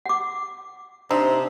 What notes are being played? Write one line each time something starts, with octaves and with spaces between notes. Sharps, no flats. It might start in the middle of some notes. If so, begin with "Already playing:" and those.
F#5 D6
C3 C4 D4 D#4